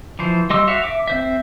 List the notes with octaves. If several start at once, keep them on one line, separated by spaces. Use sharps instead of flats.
E3 F3 C5
G3 D#5 C6 D6 E6
F#4 C#5 E5 F5
E5 D6
C4 C5 E5